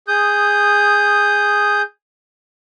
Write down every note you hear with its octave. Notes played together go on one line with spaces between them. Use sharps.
G#4 D#6 G6